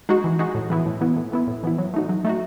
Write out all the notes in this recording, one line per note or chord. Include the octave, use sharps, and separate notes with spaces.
G#3 D#4 F#4
E3
G#3 D#4 F#4
A2
E3 B3 E4
A2
E3 B3 E4
A2
E3 B3 E4
A2
E3 B3 E4
F#3
A3 D#4 F#4
F#3
A3 D#4 F#4